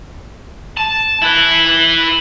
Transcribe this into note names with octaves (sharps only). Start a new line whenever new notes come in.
A5
E4 B4